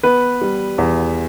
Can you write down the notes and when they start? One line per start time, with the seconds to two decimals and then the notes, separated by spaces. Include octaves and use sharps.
0.03 B3 B4
0.41 G3
0.78 E2